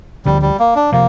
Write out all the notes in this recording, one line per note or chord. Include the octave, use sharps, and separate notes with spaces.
D2 D3 F3 G3
G3
A#3
D4
C3 F3 A#3